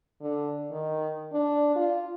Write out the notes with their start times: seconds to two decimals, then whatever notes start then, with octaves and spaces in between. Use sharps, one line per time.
0.21 D3
0.71 D#3
1.32 D4
1.76 F4